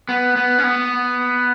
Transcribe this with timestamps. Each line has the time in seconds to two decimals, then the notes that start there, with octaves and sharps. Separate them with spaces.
0.09 B3
0.36 B3
0.59 C#4
0.64 B3